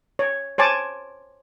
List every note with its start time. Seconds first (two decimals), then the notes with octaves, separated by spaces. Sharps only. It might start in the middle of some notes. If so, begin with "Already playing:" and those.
0.19 C#5
0.58 C5 C#5 G#5 A5 D6